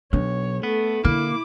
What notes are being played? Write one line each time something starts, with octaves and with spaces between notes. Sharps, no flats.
B1 D4 C#5
A3 B3
D3 A#3 E4 D6